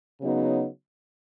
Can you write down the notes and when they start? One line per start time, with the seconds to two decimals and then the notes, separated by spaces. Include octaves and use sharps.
0.20 C#3 F#3 B3 D#4